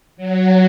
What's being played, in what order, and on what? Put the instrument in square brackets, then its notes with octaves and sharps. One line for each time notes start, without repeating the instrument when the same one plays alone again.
[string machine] F#3